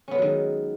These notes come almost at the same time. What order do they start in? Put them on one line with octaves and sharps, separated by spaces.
C#4 B3 G#3 F#3 D#3